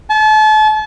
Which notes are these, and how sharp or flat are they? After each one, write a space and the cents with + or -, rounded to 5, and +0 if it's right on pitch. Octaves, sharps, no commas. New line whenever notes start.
A5 -35